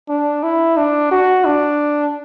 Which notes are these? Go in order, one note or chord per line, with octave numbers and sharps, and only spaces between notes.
D4
E4
D4
F#4
D4